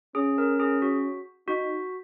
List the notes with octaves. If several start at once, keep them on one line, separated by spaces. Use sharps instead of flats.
C#4 G#4
A#4
G#4
F#4
D#4 F#4